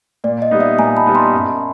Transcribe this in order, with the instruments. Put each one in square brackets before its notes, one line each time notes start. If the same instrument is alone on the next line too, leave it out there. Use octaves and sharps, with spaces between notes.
[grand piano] A#2 [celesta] D5
[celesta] D#5
[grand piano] G3 B3 D#4
[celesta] D5 E5
[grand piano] A#2 [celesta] G#5 A#5
[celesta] A5 B5
[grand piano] G3 B3 D#4
[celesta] A#5 C6
[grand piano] F#2